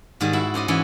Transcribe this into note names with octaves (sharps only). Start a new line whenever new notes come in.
G#2 D#3 G3 G#3 C5 D#5
E4 F#4 E5
C#4 C5 D5 D#5
G#2 E3 C#4 E4